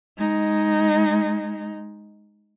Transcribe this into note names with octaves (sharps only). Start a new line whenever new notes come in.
G#3 D#4